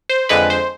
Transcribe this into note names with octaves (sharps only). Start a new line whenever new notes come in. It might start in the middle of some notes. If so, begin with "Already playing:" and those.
C5
F2 D3 G#3 B4
C5